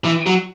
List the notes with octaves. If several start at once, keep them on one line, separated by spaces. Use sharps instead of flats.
E3
F#3